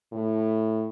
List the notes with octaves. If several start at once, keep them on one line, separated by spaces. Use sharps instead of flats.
A2